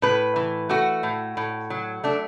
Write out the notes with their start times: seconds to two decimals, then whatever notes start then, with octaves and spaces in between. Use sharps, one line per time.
0.02 A2 B4
0.36 E3
0.69 A3 F#4
1.03 A2
1.37 A2
1.70 F#3
2.04 A3 D4